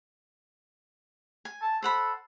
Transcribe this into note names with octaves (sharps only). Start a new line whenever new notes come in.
G#5
A5
A4 C5 F#5 B5